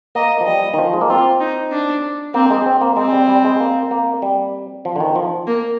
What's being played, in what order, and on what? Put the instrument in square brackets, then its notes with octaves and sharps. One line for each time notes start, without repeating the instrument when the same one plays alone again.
[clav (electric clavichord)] A#3 [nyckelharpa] D#5
[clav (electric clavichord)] F3
[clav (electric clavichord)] G3 [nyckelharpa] D#5
[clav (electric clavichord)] D#3
F3
G#3
A#3
[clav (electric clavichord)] C4 [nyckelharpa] F4
[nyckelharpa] D#4
D4
[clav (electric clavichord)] A#3 [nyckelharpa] C4
[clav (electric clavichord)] G#3
C4
A#3
[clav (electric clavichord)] G#3 [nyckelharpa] C4
[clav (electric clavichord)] G3
G3
G#3
A#3
A#3
G3
F3
D3
D#3
F3
[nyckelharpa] A#3